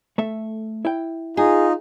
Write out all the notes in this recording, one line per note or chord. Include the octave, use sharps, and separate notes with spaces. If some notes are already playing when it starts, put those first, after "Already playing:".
A3 A4 E5
E4 G5
D#4 F4 G#4